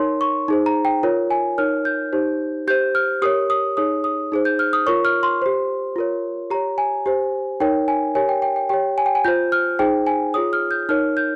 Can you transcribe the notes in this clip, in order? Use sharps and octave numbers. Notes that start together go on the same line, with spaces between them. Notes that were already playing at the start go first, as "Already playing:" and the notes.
Already playing: D#4 A#4 C#5 C6
C#6
D#4 G#4 C5
A#5
G5
F4 A#4 C#5
G#5
D#4 A#4 C#5 F6
G6
D#4 G4 C5
G4 C5 G6
F6
G4 A#4 C#5 D#6
D#6
D#4 G#4 C#5 D#6
D#6
D#4 G#4 C5
G6
F6
D#6
F4 A#4 C#5 C#6
F6
C6
G4 C5
F4 A#4 C#5
G4 C#5 A#5
G#5
G4 C5
D#4 A#4 C#5 G5
G#5
G4 A#4 C#5 G#5
G5
G5
G5
G4 C#5 G5
G#5
G5
G#5
F4 C5 G6
F6
D#4 G#4 C5 G5
G#5
F4 G#4 C#5 D#6
F6
G6
D#4 A#4 C#5 F6
G6